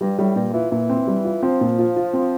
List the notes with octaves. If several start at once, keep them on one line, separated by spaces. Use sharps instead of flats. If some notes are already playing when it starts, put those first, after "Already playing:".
G2 G3
A2 G3
G2 A#2
E3 F4
A#2 E3
C4
G3
F4
F3 C4
A#2
F4
F4
C4